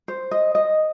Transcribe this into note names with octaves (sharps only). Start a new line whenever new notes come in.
C5
D#5
D#5